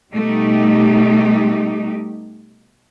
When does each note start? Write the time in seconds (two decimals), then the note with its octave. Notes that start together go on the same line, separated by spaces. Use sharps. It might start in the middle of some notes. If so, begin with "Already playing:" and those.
0.12 B2 G3 A3 D#4 G4